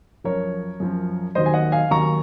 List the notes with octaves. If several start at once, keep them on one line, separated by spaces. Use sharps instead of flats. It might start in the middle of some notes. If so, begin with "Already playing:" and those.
F#2 F3 A#4 C#5
F#2 F3
D#2 D#3 F#3 C5 D#5
G#5
D#5 F#5
F5 G#5
D#2 D#3 F#3 A#5 C#6